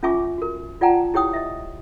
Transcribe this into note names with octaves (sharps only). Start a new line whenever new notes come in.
C#4 F4 E5 G#5 C#6 D6
F#4 A#4
F4 D5 F#5 G5 A5 A#5
E4 G4 C#5 G5 D#6
D#5 E5